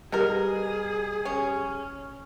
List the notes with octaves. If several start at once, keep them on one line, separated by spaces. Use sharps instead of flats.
B2 G3 G4 G#4 A#4
C#4